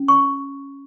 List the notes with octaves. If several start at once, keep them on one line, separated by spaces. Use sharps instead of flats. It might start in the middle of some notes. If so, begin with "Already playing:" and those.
Already playing: C#4
C#6